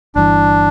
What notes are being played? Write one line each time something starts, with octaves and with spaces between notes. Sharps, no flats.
G1 G2 E3 D4